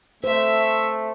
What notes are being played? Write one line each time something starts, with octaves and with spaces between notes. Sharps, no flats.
A3 C5 E5